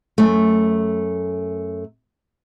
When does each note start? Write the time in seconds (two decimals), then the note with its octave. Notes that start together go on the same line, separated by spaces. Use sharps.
0.18 F#2 A3